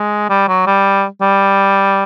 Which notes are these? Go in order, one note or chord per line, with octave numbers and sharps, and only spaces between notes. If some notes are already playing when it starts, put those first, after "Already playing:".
Already playing: G#3
G3
F#3
G3
G3